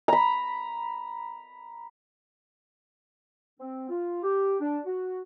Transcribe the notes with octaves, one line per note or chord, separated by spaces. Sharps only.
A#5 B5
C4
F4
G4
D4
F#4